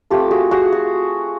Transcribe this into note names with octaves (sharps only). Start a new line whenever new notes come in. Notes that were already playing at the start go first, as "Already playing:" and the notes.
A3 C4 F4 G4 A4
F#4 G#4
F#4 G#4
F#4